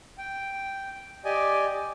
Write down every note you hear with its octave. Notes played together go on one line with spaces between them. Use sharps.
G5
G4 D5 D#5 G#5